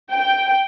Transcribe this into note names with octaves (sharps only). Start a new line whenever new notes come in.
G5